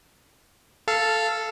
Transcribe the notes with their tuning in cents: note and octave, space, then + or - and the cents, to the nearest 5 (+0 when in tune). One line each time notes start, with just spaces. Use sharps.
A4 +0 F5 -15